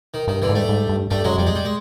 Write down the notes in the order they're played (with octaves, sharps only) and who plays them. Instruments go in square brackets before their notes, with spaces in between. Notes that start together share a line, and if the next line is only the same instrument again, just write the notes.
[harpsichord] D#3
[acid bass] G2 [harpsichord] D#3
[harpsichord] D3 E3
[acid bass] G#2
[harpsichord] G3 A3
[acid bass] G#2
G2
[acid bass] G2 [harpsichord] G3 A3
[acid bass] F#2 [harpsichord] F#3 G#3
[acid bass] F2 [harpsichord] G3
[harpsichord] G#3
G3
G#3